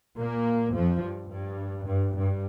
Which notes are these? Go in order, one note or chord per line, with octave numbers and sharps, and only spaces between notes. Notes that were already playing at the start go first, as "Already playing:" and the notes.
A#2 A#3
F2 F3
G2
G2
G2
G2